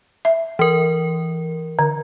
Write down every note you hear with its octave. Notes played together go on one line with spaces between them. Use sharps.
E5
E3 A#4
D3